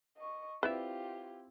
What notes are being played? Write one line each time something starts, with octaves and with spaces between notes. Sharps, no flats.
D#5 C#6
C4 E4 F4 G4 B4 D5 E5